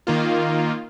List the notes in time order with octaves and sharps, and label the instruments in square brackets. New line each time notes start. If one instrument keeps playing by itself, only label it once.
[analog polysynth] D#3 A#3 F4